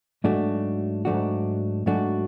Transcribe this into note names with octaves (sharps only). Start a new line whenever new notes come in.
G#2 F#3 A3 D4 F#4
G#2 F#3 A3 D4 F#4
G#2 F#3 A3 D4 F#4